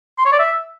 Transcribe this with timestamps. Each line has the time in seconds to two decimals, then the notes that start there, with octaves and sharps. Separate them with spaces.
0.18 C6
0.25 C#5
0.32 D5
0.39 E5